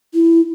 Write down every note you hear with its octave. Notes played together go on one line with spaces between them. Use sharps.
E4